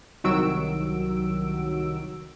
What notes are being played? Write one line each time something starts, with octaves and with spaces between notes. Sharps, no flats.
C2 D#3 F#3 F#4 E6 D7